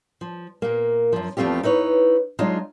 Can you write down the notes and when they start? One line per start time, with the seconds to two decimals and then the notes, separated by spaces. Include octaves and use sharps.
0.21 F3
0.62 A#2 A#3
1.12 F#2 F3
1.37 E2 F3 A3 C4 F4 G4
1.63 D#4 E4 B4 C#5
2.39 F#3 G#3 D4 D#4 F4